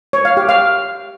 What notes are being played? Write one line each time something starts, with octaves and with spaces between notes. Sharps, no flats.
C#5
F5
G4
F5